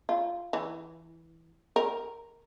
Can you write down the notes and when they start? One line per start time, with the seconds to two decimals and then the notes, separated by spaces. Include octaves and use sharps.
0.09 F4
0.53 E3
1.76 A#4